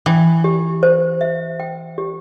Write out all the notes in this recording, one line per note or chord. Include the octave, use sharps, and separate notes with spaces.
E3 G5
G4
C5
E5
G5
G4